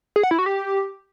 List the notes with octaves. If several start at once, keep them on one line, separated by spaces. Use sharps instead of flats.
G#4
F#5
E4
F#4
G4